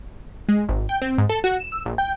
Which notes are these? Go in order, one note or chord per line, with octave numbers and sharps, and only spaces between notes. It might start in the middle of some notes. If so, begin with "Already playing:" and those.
G#3
G#1
G5
C4
G#2
A4
F#4
E7
E6
A#1
G5